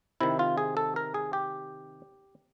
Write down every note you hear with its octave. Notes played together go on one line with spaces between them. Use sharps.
C3 D#3 E4
F4
G#4
A4
A#4
G#4
G4